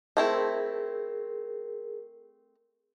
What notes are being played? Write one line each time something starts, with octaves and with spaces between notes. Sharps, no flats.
A3 C4 E4 G#4 A#4